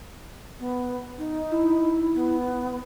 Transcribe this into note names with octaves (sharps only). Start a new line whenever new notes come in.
B3
D#4
E4
B3